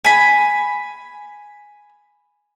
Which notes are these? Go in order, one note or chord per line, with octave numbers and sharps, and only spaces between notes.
G#5 B5